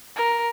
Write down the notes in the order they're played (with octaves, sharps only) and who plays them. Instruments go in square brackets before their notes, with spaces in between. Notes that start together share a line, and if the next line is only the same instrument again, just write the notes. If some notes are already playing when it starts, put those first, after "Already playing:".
[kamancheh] A#4